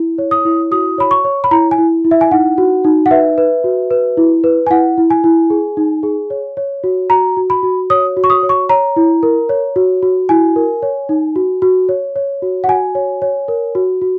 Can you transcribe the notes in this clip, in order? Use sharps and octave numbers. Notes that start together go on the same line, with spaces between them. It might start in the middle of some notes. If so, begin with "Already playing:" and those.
Already playing: E4
C#5
D#6
E4
F#4 D#6
C#5 B5
C#6
C#5
B5
E4 A#5
G#5
E4
E4
E5
G#5
D#4 F#5
F#4
D#4
F#5
B4 E5
B4
F#4
B4
E4
B4
G#5
E4 F#5
E4
G#5
E4
G#4
D#4
G#4
C#5
C#5
F#4
F#4 A#5
F#4
B5
F#4
C#5 D#6
F#4
C#6
D#6
C#5
C#6
C#5 A#5
E4
A#4
C#5
F#4
F#4
E4 G#5
A#4
C#5
D#4
F#4
F#4
C#5
C#5
F#4
F#5
F#4 G#5
C#5
C#5
A#4
F#4
F#4